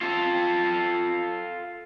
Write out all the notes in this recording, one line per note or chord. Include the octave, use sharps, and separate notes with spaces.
F4 A4